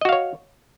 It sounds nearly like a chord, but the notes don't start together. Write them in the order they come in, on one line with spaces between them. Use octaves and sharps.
D#5 F#4 F5 C#5